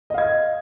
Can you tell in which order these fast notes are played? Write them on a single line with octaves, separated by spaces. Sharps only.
D#5 F5 G#6